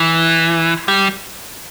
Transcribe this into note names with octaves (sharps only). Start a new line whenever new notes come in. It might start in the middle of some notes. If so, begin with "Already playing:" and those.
Already playing: E3
G3